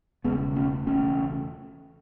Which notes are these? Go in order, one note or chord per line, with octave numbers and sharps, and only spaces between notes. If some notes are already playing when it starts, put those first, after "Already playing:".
E1 E2 C#3 G#3 B3
A3 C#4
E1 E2 C#3 A3 C#4